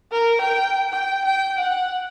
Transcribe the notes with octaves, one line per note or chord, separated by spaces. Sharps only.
A#4
G5
G5
G5
F#5